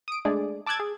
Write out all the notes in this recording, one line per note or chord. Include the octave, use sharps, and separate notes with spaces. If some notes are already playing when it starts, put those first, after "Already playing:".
D#6 D7
G#3 A3 D4 G#4 D5
A5 D6 E6 F#6 G#6 A6
G#4